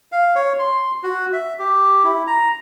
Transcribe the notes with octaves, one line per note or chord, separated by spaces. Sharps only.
F5
C#5
C6
F#4
E5
G4
E4
A#5